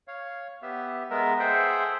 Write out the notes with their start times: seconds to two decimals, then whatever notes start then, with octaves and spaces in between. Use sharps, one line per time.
0.08 C#5 F5
0.62 B3 G4 E5
1.10 G#3 B3 A#4 E5
1.40 G#4 A4 C5 E5 F#5 G5